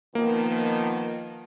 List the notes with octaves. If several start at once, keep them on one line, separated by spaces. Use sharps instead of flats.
D#3 F3 A#3 B3